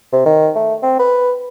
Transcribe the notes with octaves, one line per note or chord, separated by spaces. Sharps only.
C3
D#3
A3
C4
B4